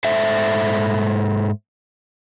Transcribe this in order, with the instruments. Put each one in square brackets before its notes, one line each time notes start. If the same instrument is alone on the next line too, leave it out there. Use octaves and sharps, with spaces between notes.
[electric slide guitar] G#2 A4 C5 E5